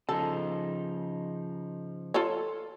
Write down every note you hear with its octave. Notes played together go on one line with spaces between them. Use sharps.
C#3 F3 D#4 A4
F4 A4 C#5